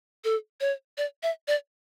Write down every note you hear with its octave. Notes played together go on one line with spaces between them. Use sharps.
A4
C#5
D5
E5
D5